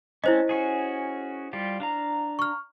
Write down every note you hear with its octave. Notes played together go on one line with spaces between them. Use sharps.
A3 C4 C#4 E4 C5 D#5
C#4 F#4 G#4
G3 F4 G4
D4 F5 A#5
C#6 F6